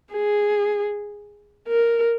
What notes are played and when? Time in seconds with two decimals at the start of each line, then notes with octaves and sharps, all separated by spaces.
0.13 G#4
1.68 A#4